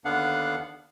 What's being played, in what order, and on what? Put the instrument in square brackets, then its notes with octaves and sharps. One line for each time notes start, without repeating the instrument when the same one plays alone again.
[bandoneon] D#2 D3 B3 D4 F5 F#5